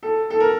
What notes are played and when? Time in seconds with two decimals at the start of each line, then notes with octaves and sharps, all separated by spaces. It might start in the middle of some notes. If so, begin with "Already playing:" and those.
0.03 A4
0.30 A4
0.40 A#4